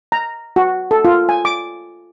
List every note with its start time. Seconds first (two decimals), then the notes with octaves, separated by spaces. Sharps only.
0.12 A#5
0.56 F#4
0.91 A4
1.05 F4
1.29 G#5
1.45 D6